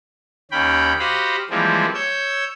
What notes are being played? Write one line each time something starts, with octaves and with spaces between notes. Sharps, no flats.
D#2 C#4 G5 B5
F#4 G4 C5 D#5 F5 B5
E3 F3 G3 G#3 A#3 C4
C#5 E6 G6